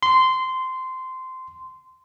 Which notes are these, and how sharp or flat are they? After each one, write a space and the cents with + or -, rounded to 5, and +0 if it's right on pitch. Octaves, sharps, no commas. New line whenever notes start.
C6 -15